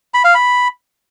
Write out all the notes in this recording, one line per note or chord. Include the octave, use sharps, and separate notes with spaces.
B5
F5
B5